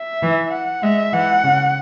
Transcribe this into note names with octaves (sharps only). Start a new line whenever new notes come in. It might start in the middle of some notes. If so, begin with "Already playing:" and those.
Already playing: E5
E3
F#5
G#3 E5
E3 F#5
C#3